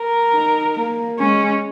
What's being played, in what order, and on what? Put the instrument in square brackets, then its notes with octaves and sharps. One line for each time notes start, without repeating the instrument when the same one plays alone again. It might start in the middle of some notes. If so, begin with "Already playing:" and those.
Already playing: [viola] A#4
[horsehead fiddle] D#4
A#3
[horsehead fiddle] G#3 [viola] C#4